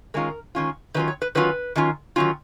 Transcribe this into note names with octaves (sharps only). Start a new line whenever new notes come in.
D#3 G#3 C#4 F4 A#4
D#3 G#3 C#4 F4
D#3 F#3 C#4 F4 B4
C#5
B4
D#3 F#3 C#4 F4 B4
D#3 F#3 C#4 F4
D#3 F#3 C#4 F4